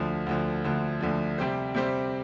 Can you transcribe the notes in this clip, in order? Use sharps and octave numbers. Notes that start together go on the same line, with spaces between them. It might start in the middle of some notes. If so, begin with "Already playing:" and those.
Already playing: D2 D3 F3
D2 D3 F3
D2 D3 F3
D2 D3 F3
C3 G3 C4 G4 C5
C3 G3 C4 G4 C5